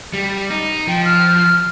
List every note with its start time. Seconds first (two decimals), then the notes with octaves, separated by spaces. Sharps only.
0.13 G3
0.50 D#4
0.87 F3 G5
1.05 F6